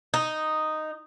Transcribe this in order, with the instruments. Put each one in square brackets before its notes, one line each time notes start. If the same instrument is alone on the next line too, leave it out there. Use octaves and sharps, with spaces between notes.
[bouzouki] D#4